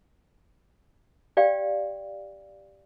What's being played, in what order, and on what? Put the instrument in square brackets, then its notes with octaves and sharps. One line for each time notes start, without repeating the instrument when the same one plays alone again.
[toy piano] G4 D5 F5 G5